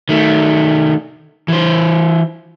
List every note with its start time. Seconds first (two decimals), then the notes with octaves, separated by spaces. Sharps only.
0.09 D#3 A3
1.48 E3 C5